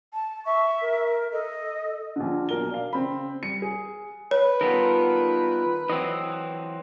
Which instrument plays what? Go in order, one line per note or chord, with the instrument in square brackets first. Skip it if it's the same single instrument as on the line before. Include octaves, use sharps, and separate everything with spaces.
[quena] A5
[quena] E5 [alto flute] C#6
[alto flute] A#4
[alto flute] A4 [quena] D#5
[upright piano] A#1 D3
B1 A#4 G7
D5 F5
C#3 C4 B5
G3 C#7
G#4
[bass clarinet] B4 [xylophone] C#5
[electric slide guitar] D#3 G3 B3 [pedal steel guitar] F4 A4 A#4
[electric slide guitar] E3 F#3 C4 [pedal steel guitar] D#5 E6